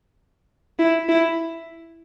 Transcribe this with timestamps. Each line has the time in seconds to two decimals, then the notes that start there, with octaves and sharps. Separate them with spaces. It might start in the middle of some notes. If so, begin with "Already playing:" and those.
0.79 E4
1.09 E4